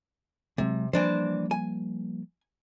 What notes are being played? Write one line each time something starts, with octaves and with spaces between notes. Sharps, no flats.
C3 F#3 G#3 C4
E3 F3 G3 A#3 D4 C5
G#5